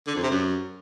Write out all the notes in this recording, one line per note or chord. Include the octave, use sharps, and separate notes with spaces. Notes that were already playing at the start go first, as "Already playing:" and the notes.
D3
F2
C3
F#2